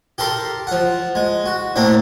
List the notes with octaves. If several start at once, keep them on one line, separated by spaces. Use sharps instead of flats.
G4 A4 A#4 C6
F3 F#5
G#3
F#4
A2 A#3 C4 D4